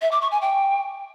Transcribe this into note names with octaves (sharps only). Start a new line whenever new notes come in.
E5
D6
C#6
G#5
G5